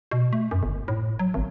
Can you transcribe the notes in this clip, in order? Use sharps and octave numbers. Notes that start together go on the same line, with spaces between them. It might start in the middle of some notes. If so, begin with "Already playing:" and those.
B2
A3
F#2
G1
A2
F#3
G#1